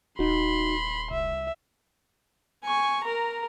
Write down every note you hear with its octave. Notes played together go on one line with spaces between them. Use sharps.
D#1 D#4 F#4 B5 C6
C2 E5
G#5 C#6
A#4 A#5